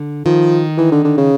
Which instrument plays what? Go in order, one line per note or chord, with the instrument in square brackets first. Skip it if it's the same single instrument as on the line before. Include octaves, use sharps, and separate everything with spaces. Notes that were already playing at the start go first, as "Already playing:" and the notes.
Already playing: [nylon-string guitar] D3
[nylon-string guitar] D#3 [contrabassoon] F3
[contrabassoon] E3
D3
D3
C#3